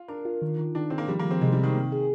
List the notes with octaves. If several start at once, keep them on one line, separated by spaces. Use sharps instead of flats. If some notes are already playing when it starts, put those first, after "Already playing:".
Already playing: F4
D4 A#4
F4
D#3
D#3
D#3 D4
D#3 C4
A#3
F3 G3
A#3
F3
C4
C3 G#3
G3
D#3 C4
A#3
G#4